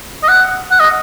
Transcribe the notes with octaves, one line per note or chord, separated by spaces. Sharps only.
D#5
F#5
F#5
D#5